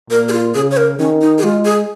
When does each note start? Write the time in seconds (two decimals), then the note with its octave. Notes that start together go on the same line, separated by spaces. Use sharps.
0.10 A#2 A#4
0.29 G#4
0.32 F4
0.54 C#3 G#4
0.71 C#5
0.77 A#4
0.99 D#3 C#4
1.21 D#4
1.38 G#4
1.43 G#3 F4
1.65 G#4